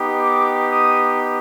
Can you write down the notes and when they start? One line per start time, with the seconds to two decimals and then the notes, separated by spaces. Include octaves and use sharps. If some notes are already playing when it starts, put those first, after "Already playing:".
Already playing: B3 D#4 G4
0.21 D6
0.68 D#6